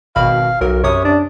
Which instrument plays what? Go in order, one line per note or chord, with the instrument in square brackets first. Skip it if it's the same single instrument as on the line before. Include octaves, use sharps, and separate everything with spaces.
[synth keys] G#1 B2 B5 [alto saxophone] F5
[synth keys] B1 A#4 [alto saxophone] F#3
[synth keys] F#2 C3 D#6 [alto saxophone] C#5
[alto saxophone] D4